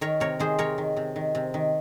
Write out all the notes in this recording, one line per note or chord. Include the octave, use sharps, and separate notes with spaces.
D#3 A#4 C#5
C3 A#4 C#5
D#3 G#4 C5
C3 A#4 C#5
D#3
C3
D#3
C3
D#3